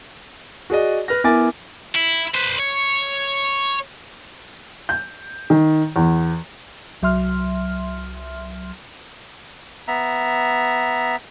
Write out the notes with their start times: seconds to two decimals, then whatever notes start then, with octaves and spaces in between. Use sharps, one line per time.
0.70 F#4 G#4 D5 D#5
1.08 B4 F6 A#6
1.24 B3 E4 A#4 G#5 D6 A6
1.95 E4
2.34 B4 C5
2.58 C#5
4.89 G6
5.50 D#3
5.96 E2
7.02 C2 F#3 E5 C6 F6
9.88 B3 E5 A#5